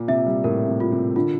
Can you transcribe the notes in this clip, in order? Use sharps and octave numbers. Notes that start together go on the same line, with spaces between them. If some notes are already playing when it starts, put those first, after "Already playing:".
Already playing: A#2 F4
C3 E5
G3
A2 A#4
C3
F4
C3
D3 F4